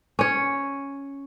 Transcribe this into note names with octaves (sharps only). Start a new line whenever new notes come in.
C#4 C#5